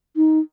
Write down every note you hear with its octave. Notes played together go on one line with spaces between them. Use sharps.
D#4